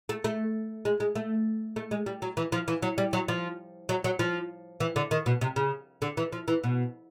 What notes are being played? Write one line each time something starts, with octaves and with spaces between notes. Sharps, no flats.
A3
A3
G#3
G#3
A3
A3
G#3
G3
F#3
E3
F3
E3
F#3
G3
F#3
F3
F#3
F#3
F3
E3
D3
D#3
B2
C3
C#3
D3
E3
F3
E3
B2